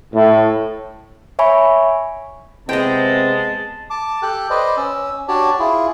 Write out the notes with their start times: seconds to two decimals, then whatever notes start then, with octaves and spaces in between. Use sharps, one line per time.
0.14 A2
1.39 C#5 E5 G#5 B5 C#6
2.69 C3 G#3 B3 C4 D#5 G5 A5
3.90 A5 D6
4.22 G4 A4 G5 F#6
4.50 B4 C5 D5 D#5
4.77 C#4 E6
5.28 D4 F#4 G4 C#5 D5 A5
5.60 E4 F4 G#4